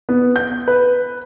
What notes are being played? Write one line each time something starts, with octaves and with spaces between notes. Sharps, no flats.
B3
G6
B4